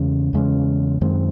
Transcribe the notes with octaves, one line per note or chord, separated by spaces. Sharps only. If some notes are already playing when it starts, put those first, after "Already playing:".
Already playing: E2 C#3 G#3 C#4
E2 C#3 G#3 C#4
F#2 D#3 G#3 C4